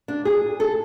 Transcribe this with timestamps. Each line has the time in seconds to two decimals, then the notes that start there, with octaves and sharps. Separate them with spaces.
0.08 D4
0.25 G#4
0.60 A4